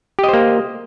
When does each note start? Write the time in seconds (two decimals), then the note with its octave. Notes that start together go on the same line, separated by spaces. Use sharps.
0.19 G4
0.24 D#5
0.29 C5
0.34 A#3